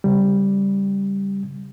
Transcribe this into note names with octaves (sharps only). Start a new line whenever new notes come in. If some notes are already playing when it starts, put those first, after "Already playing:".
C#3 G3